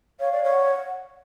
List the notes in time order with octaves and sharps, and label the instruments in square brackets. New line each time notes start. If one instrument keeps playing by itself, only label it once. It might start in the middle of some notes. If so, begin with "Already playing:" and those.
[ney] C#5 [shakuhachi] F5
[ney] D5
C#5
[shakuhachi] F#5